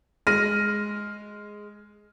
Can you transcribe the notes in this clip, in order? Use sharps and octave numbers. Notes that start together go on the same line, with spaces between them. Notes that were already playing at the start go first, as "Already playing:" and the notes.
G#3 F6 A#6 D#7